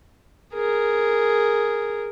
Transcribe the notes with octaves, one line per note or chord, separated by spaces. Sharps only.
G#4 A#4